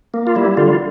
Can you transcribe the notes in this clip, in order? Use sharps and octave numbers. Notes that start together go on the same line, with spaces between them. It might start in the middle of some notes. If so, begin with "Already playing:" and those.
A#3
F4
G3 E4
D3 F4